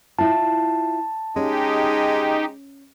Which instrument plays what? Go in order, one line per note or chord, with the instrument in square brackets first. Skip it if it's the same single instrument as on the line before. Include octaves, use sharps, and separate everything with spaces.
[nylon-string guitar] E4 F4 [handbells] A5
[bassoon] G#3 [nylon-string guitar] C#4 [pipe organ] D#4 G4